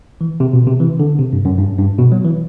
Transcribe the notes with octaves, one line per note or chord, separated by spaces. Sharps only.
E3
C3
B2
C3
E3
D3
C3
G2
F#2
G2
G2
B2
F#3
E3